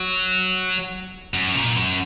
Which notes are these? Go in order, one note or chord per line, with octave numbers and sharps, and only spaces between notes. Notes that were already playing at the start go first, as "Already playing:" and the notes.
Already playing: F#3
F#2
A#2
F#2